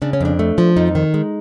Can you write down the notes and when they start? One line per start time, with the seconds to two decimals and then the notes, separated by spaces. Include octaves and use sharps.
0.02 C#3 D4
0.13 C#4
0.20 F2 D4
0.39 A3
0.58 F3
0.76 F2 D#4
0.95 D#3
1.14 G#3